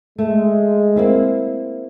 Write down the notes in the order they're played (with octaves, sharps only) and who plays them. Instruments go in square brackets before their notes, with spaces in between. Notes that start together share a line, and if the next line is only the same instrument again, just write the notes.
[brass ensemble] G#3 [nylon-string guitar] A3
[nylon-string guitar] A#3 C4 E4